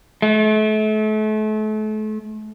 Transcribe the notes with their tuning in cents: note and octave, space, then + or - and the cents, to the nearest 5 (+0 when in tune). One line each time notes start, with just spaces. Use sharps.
A3 -35